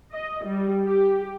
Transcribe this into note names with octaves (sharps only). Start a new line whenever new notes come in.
D#5
G3
G4